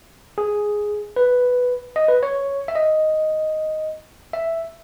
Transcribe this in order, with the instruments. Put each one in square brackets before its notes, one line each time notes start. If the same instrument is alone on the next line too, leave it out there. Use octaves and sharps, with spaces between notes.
[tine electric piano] G#4
B4
D#5
B4
C#5
E5
D#5
E5